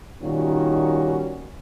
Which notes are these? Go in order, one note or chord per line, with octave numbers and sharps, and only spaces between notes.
A#2 D#3 G3 C#4 F#4